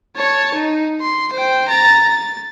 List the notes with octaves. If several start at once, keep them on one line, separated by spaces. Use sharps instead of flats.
C#5 A5
D#4
C6
C5 G5
A#5 A6
A6